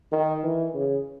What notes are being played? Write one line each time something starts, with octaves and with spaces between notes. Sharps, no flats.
D#3
E3
C#3